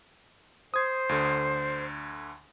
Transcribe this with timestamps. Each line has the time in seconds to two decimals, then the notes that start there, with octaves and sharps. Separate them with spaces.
0.74 C5 D#6 G#6
1.09 D2 D3